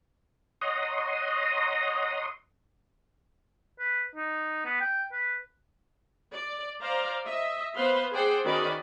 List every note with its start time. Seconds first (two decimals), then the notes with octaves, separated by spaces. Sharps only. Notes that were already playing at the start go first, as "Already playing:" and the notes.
0.61 C#5 D#5 F#5 A#5 C6 D#6
3.79 B4
4.15 D#4
4.65 B3
4.81 G5
5.12 B4
6.34 D5
6.81 C5 D5 F5 A#5
7.26 D#5 E5
7.75 B3 B4 C5 F5 C6
8.12 G#4 C5 D5 F#5 G5
8.44 D#3 C#4 F#4 D5 D#5 B5